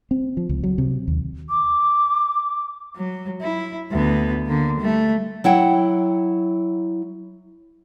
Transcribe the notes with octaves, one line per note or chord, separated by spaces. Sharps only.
C4
F3
C#2
F#3
C3
D#2
D6
F#3
E4
D2 B3
D3 A#3
G3 A3
F#3 E4 F#5 G5